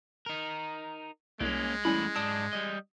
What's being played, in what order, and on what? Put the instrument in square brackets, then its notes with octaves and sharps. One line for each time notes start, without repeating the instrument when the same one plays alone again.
[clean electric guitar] D#4 A#4
[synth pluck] C2 [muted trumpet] G#3 [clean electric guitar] A#3 C#4
[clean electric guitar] E2 A3 B5 [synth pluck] G3 C#4 E4
[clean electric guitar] G#2 D5 A5 [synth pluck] D#6
[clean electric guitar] G3 D#5